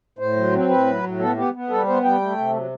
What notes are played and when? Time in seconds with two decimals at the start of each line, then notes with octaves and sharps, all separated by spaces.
0.19 A2 C5
0.36 F#3
0.52 C4
0.69 A2 B4
0.86 F#3
1.03 A2
1.19 B3 A4
1.37 B3 G4
1.54 B3
1.70 G3 A4
1.87 B3 C5
2.04 G3 G5
2.21 A3
2.37 C3
2.54 F#3